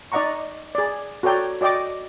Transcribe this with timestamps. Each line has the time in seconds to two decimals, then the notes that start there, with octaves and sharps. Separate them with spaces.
0.12 D#4 D5 D#5 F#5 A#5 C#6
0.75 G#4 D5
1.23 F#4 A4 C#5 D5 G5 A#5
1.61 F#4 D5 D#5 G5 D6